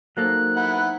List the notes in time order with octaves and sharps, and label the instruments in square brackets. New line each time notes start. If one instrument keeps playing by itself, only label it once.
[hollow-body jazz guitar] F#3 A#3 A4 [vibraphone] D#4 C5 A#5 [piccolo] F#6
[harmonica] E4 F#5